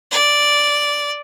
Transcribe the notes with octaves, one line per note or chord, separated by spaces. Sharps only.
D5